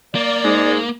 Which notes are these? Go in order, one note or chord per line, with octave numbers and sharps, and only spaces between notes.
A#3 D5
G#2 G#3